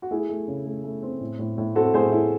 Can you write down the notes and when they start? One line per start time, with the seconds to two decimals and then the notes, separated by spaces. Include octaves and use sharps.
0.02 F#4
0.11 A3 E4 G#4
0.29 A3
0.48 C#3
0.66 A3
0.84 A3
1.03 C4
1.21 A2
1.39 A2
1.58 A2
1.75 C4 F#4 A4
1.94 A2 G#4 C5
2.12 A2 E4 G#4